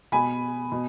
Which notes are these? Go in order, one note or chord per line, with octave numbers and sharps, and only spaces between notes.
B2 G#5 B5
B2